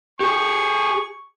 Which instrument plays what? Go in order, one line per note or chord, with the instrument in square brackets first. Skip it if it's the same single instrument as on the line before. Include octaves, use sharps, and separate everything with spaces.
[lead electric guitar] G4 G#4 [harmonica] C#6